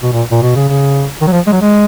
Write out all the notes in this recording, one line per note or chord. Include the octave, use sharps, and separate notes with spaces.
B2
A#2
A#2
B2
C#3
C#3
D#3
F#3
F3
G#3
F#3
G#3